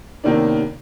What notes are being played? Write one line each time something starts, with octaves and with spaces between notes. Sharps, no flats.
C3 D#3 A#3 B3 C#4 D4